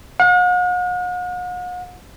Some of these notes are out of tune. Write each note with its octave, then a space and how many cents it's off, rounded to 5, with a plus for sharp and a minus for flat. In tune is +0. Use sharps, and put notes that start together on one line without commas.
F#5 -45